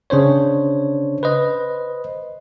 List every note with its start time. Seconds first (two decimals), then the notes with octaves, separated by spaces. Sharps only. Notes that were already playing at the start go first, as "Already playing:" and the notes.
0.10 C#3 D4 C5 C#5
1.23 B4 C5 D#5